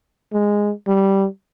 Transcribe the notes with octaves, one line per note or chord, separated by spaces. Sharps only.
G#3
G3